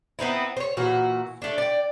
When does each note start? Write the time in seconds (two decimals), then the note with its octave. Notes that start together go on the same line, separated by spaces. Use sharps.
0.19 B3 C4 D#4 E4
0.57 C5 C#5
0.77 A#2 E3 F#4
1.42 A3 D4
1.58 D5 G5